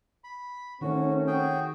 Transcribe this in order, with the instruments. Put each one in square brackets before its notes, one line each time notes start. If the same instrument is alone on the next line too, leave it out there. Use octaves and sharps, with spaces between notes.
[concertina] B5
[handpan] D#3 E4 C5 [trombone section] A3 C4 C#4 [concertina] F#4
[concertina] F#4 G#4 G5